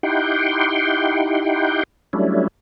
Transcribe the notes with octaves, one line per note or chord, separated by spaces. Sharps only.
D#4 E4 G4 F#5 G5 C6
F#3 G3 A3 C#4 D4 E4